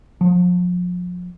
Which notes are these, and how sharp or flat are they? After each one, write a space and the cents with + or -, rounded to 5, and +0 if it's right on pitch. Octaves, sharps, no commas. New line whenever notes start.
F3 +40